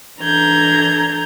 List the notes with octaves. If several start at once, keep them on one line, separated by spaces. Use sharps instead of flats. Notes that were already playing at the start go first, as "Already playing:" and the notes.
E3 D4 A4 A#5 G6 G#6